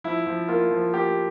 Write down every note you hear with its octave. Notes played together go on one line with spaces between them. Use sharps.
F3 E4
F3
A#3 F4
F3
A#3 G4